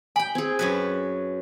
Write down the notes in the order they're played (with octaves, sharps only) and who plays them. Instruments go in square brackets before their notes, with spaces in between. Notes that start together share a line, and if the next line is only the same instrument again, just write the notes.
[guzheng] G5 B5 [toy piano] G#5
[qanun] C4 G#4
[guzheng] F#2 F#3 B4